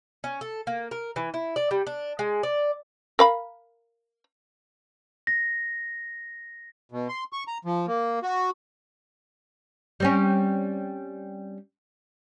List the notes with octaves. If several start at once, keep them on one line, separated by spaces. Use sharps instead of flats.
C#4
A4
A#3
A#4
E3
E4
D5
G3
D4
G#3
D5
A#4 F5 B5
A#6
B2
C6
C#6
A#5
F3
A#3
F#4
G3 C4 C#4